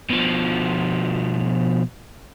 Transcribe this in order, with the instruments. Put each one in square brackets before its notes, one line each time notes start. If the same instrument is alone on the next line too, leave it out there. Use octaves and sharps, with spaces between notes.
[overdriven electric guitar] B2 F3